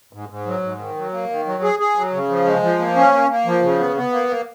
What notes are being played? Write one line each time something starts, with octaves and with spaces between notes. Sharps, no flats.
G#2
G#2
F#3
G#2
D#3
F#3
A#3
D#3
F#3
G#4
G#4
F#3
C#3
F3
G#3
F3
A#3
C#4
A#3
A#3
F3
C#3
B3
B3
A#3
A#3